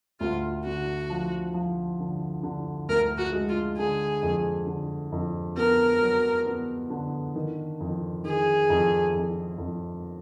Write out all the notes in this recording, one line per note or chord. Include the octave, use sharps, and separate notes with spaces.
D2 F4
D3 F#4
F3
F3
D3
D3
D2 A#4
F#4
G#3
F4
D3 G#4
F2
D3
F2
B3 A#4
F#3
B3
D3
D#3
F2
D#3 G#4
F2
F2
F2